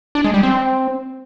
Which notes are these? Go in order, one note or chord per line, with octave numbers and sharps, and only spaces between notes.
D4
G#3
G3
C4